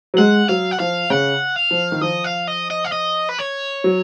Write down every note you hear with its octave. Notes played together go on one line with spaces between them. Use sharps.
F#3
G#3 F#5
F#3 F5
F#5
F3 F5
C#3 F#5
F5
F3
D#3
F3 D#5
F5
D#5
D#5
F5
D#5
B4
C#5
F#3